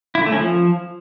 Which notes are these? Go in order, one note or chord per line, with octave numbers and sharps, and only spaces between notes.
E4
D3
A3
C#4
F3